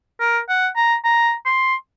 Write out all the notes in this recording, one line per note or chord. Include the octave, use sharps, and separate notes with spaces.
A#4
F#5
A#5
A#5
C6